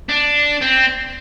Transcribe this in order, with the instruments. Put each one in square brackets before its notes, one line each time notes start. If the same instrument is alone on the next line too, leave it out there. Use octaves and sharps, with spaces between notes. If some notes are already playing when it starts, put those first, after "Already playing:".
[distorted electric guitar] D4
C4